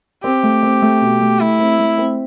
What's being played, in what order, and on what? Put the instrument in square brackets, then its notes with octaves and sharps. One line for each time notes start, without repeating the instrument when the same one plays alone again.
[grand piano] C4 [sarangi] G4
[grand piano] A3
C4
A3
B2
A3
[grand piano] A3 [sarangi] E4
[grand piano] C4
A3
C4